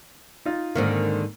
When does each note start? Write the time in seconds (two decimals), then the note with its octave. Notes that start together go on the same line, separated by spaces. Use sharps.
0.45 D#4 F4
0.75 G#2 D3 D#3 A#3 C4